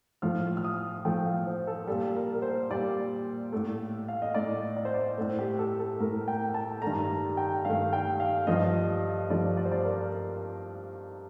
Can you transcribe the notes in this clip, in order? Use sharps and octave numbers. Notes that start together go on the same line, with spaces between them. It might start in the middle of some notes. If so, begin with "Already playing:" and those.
A2 F3 A3 F6
F6
D#6
A2 F3 A3 G5
F5
C5
A4
A#2 G3 A4
A#4
A#4
C5
A#2 G3 D5
A2 A3
F5
D#5
A2 A3 D5
D5
C5
D5
A2 A3 C5
G4
A4
A4
A2 A3 A#4
G5
A5
G2 D#3 A3 A#5
G5
G2 D#3 A3 F5
G5
F5
G2 F3 A3 D#5
G2 F3 A3 D5
D5
C5
D5
A#4